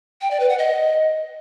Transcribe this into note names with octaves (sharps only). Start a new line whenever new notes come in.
G5
D5
B4
F#5
D#5